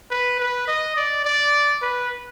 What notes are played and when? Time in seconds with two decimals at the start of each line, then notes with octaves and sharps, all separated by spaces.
0.11 B4
0.40 B4
0.68 D#5
0.97 D5
1.25 D5
1.82 B4